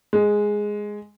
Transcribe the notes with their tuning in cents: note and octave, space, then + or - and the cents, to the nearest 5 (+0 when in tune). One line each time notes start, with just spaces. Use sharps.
G#3 +0